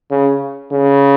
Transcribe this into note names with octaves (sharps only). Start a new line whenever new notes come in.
C#3
C#3